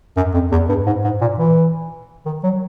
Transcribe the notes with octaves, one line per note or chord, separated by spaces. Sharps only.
F#2
F2
E2
G2
G#2
G#2
A#2
E3
D#3
F#3